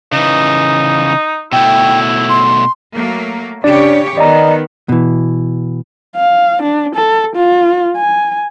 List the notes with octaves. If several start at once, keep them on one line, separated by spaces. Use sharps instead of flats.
C#3 E3 D#4
B2 A3 E4 G5
C6
F#3 A3 A#3
C#3 D4 G4 C#5 D5
D#3 B3 D5 D#5 A#5
B2 E3
F5
D4
A4
F4
G#5